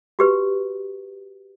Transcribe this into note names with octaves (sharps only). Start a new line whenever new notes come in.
F#4 G4 B4